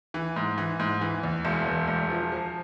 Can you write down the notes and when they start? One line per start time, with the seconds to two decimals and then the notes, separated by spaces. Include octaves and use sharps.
0.14 E3
0.36 G#2
0.58 E3
0.79 G#2
1.01 E3
1.23 E2
1.45 E1
1.66 E2
1.88 E1
2.10 F3
2.32 F3